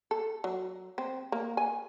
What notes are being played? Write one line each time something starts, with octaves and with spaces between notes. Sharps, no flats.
A4
F#3
C4
A#3
G#5